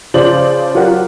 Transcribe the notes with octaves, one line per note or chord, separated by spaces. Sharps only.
C#3 F3 C5 D5 F#7
F#3 F4 G4 A#4 F#5